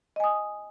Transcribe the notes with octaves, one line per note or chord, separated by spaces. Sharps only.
D#5 G#5 D#6